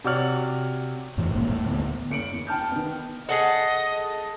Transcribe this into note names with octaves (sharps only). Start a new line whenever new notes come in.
C3 F#4 C#5 D5 F6 F#7
F2 A2 E3
E1 A1 G#2 A#3
A2
D2 B3
F#1 C#7 D7 F#7
E2
G5 A5 F6 G6
D#3 B3
G#4 A4 D#5 F#5